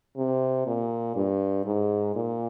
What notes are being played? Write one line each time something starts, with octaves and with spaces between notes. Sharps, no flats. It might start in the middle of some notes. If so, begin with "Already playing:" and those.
C3
A#2
G2
G#2
A#2